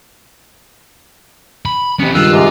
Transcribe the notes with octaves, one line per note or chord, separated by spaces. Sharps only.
B5
C3 E3 B3 C#4
C#2 G2 D#3 F4 E6 F#6
G#2 C3 G#3